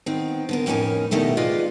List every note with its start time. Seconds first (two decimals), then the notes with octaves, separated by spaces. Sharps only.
0.06 D#3 B3 C4
0.49 D3 B3 A#4
0.66 F2 A2 C#4 D#4 A#4 G#5
1.11 G2 B2 D#3 G3 A3 E4
1.37 F4 G#4 B4 D5 D#5 F5